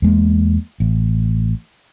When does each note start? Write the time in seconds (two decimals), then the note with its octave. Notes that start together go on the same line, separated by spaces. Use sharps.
0.02 E2 G#3 A#3
0.80 A1